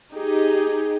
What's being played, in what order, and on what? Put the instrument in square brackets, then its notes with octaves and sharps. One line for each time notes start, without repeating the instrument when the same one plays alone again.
[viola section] D#4 G4 G#4